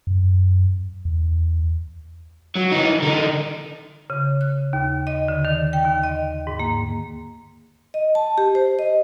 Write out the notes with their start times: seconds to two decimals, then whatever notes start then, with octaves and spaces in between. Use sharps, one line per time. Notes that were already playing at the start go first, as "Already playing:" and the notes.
0.07 F#2
1.05 E2
2.55 F#3
2.72 E3 D#4
3.02 D3 D#4
4.10 C#3
4.41 F#6
4.73 D#2
5.07 D#5
5.28 D3
5.45 D#3
5.73 G5
5.85 D#2
6.03 D#5
6.47 G#2
6.60 A#3
7.94 D#5
8.15 A5
8.38 G4
8.55 C5
8.79 D#5